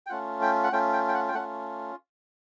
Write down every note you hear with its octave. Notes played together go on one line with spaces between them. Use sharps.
G5
A3 C#4 F4 F#5
G5
F#5
A3 C#4 F4 G5
G5
G5
F#5
G5
A3 C#4 F4 F#5